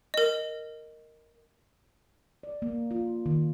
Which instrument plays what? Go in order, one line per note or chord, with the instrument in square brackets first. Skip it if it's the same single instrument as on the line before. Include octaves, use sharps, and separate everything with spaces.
[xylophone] A#4 D#5
[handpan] D5
A#3
F4
D#3